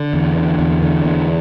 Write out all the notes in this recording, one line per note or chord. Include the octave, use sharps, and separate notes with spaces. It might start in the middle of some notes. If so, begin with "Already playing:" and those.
Already playing: D3
E2
D3
E2
D3
E2